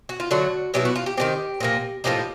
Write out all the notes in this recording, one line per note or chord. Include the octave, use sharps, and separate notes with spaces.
F#4
F4
D3 F#3 A3 F#4
B2 F#3 B3 E4 G4
F#4
F4
G4
D#3 G#3 C4 G4
A#2 F3 A#3
A2 F3 A#3 D#4 G4